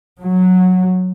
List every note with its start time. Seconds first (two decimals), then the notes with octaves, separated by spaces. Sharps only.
0.21 F#3